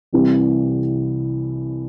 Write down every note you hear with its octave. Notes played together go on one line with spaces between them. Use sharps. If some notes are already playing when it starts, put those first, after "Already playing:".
C2 C3 E3 G3 C4